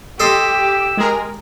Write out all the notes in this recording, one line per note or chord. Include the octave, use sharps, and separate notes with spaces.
G4 A4 D#5 C6 E6
G#3 G#4 A#4